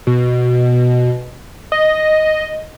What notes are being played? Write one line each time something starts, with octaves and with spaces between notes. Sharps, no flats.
B2
D#5